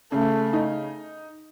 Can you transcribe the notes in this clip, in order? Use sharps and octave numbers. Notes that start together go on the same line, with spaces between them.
C#3 A3
D#4